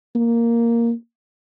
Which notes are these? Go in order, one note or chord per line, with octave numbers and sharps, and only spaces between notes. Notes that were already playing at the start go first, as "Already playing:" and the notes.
A#3